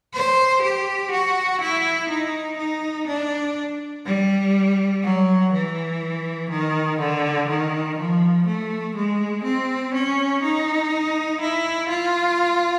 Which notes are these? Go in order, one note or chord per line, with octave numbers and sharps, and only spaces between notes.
C5
G4
F#4
E4
D#4
D#4
D4
G3
F#3
E3
D#3
D3
D#3
F3
A3
G#3
C4
C#4
D#4
E4
F4